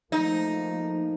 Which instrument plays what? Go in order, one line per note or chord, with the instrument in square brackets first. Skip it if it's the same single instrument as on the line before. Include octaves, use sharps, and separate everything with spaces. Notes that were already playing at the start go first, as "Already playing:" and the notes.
[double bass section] F3 A3 A#3 [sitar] D#4